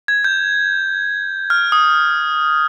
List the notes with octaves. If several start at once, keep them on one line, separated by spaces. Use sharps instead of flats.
G#6
G6
F6
D#6